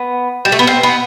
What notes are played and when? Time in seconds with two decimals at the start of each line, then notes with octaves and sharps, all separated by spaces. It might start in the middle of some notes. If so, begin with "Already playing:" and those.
Already playing: B3
0.45 G3
0.52 A3
0.59 B3
0.67 C4
0.83 B3